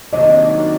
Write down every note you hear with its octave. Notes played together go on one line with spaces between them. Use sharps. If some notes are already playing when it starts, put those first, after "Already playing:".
C3 D#3 F#3 A#3 D4 D#5